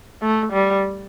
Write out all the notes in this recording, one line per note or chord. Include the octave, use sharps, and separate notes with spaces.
A3
G3